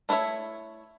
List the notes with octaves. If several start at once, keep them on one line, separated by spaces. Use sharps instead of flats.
A3 E4 B4 C#5 E5